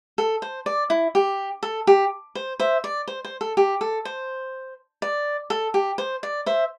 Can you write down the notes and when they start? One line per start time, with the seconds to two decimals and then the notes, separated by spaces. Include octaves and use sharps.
0.18 A4
0.42 C5
0.66 D5
0.90 E4
1.15 G4
1.63 A4
1.87 G4
2.35 C5
2.60 C5 E5
2.84 D5
3.08 C5
3.25 C5
3.41 A4
3.57 G4
3.81 A4
4.05 C5
5.02 D5
5.50 A4
5.74 G4
5.98 C5
6.23 D5
6.46 C5 E5